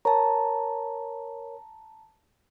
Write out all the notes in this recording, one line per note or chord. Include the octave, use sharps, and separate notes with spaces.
A#4 C#5 A5 A#5